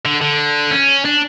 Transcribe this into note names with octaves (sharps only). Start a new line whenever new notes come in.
D3
D3
C#4
D4